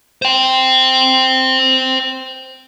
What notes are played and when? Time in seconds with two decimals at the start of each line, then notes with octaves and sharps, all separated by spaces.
0.22 C5 G5